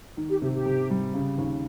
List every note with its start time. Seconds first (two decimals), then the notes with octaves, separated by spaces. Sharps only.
0.17 D#3
0.29 G4
0.42 C3 G4
0.54 G4
0.66 C3
0.90 G3
1.14 C#3
1.38 D#2